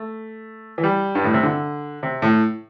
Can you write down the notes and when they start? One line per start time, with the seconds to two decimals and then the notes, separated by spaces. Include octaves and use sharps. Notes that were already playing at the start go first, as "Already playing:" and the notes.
Already playing: A3
0.78 E3
0.83 G3
1.15 G2
1.24 A2
1.34 C3
1.43 D3
2.03 C3
2.22 A2